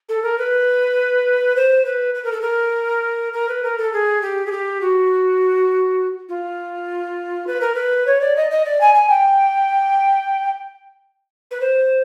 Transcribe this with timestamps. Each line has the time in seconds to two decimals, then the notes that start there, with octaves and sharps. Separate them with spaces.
0.09 A4
0.23 A#4
0.38 B4
1.56 C5
1.85 B4
2.15 B4
2.24 A#4
2.32 A4
2.41 A#4
3.33 A#4
3.48 B4
3.63 A#4
3.78 A4
3.93 G#4
4.22 G4
4.46 G#4
4.51 G4
4.81 F#4
6.29 F4
7.47 B4
7.61 A#4
7.75 B4
8.06 C#5
8.21 D5
8.36 D#5
8.51 D#5
8.65 D5
8.81 G#5
8.95 G#5
9.09 G5
11.51 B4
11.61 C5